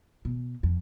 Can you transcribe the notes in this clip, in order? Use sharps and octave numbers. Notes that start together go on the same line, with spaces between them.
B2
F2